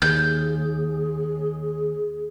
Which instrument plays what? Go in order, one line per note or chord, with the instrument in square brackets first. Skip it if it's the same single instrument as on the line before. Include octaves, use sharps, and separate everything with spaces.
[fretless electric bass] D#2 [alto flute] G#4 [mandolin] G6